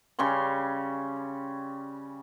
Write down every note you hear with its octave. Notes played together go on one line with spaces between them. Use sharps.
C#3 G3 C#4 C6